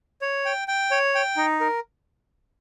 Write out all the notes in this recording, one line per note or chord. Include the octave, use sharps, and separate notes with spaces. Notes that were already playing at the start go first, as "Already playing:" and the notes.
C#5
G5
G5
C#5
G5
D#4
A#4